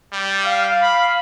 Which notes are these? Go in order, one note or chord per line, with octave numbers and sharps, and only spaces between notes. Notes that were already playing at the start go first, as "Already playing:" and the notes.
G3
F5
B5